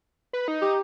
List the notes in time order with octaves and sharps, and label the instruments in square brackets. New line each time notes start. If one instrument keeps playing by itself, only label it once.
[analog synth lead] B4
D#4
[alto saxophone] G4